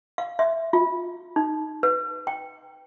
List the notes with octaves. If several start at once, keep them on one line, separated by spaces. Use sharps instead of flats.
F5
E5
F4
D#4
B4
G5